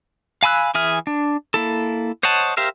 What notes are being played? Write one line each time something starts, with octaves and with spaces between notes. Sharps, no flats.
F5 G#5 B5 E6 F#6
E3 G#4 E5 F6
D4
A#3 E4 A4
C5 C#5 D#5 F#5 A5
G4 A#4 C5 E5 F5